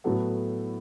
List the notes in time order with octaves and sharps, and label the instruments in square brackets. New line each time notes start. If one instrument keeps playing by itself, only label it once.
[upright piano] A2 F#3 B3 F#4 A4